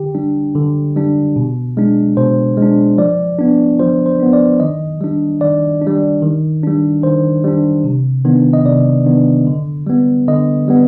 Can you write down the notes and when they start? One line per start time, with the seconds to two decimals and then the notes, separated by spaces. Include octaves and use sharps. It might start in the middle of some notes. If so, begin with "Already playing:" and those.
Already playing: D3 G4
0.15 G3 D4
0.55 D3
0.96 G3 D4
1.36 B2
1.77 G#3 D4
2.17 B2 C5
2.57 G#3 D4
2.98 F3 D5
3.39 B3 D4
3.79 F3 C5
4.06 C5
4.20 B3 D4
4.33 D5
4.60 D#3 D#5
5.01 G3 D4
5.41 D#3 D5
5.82 D4
5.87 G3
6.22 D#3
6.63 G3 D4
7.03 D#3 C5
7.44 G3 D4
7.84 C3
8.25 D#3 B3 D4
8.53 D#5
8.65 C3 D5
9.06 D#3 B3 D4
9.47 D3
9.87 G3 B3
10.28 D3 D#5
10.68 G3 B3